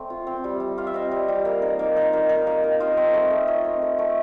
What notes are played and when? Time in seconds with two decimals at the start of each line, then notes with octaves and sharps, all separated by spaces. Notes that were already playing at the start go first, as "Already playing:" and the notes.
Already playing: A3 C4 D5
0.10 F4
0.27 C4
0.44 G3
0.60 G3
0.78 F4 F5
0.87 E5
0.94 C4 D#5 F5
1.11 G3
1.28 G3
1.45 A#3
1.62 D#4
1.79 A#3
1.96 D#4
2.13 A#3
2.29 D#4
2.47 A#3
2.64 D#4
2.80 F4 D#5 F5
2.97 C4
3.14 A3
3.31 A3
3.47 F4 C#5 D#5
3.64 C4
3.82 A3
3.99 A3